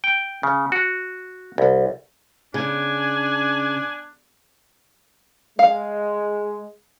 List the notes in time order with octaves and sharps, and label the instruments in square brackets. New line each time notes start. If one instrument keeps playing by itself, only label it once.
[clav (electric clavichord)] G5
C#3
F#4
C2
[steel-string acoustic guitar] C#3 [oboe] D4 [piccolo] G#5
[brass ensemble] G#3 [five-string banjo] F5